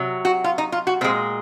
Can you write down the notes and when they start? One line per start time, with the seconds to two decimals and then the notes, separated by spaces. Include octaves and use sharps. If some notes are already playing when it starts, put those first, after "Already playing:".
Already playing: C3 F#3
0.25 F#4
0.44 F4
0.58 D#4
0.72 F4
0.87 F#4
1.01 A#2 G#3 C4